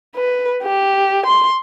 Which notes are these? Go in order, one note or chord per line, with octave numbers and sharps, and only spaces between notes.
B4
G4
C6